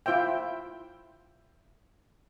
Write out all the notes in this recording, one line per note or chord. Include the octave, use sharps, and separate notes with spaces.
E4 F4 C5 E5 G5